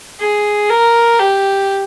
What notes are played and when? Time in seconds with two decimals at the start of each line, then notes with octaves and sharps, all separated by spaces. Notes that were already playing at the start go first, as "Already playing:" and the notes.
0.20 G#4
0.69 A#4
1.19 G4